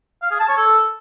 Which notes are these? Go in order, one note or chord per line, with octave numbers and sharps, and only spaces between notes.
F5
G#4
A5
C#5
A4